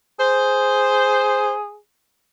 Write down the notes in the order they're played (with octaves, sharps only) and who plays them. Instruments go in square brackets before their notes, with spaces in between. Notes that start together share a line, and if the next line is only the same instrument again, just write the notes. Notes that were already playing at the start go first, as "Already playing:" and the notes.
[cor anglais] G#4 [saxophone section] C5